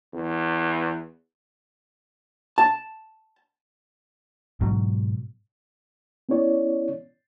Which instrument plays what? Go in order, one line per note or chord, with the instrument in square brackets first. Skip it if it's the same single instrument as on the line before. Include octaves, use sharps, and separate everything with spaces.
[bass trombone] E2
[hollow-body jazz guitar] A5
[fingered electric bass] G#2 B2 F#3
[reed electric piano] B3 C#4 E4 C#5 D5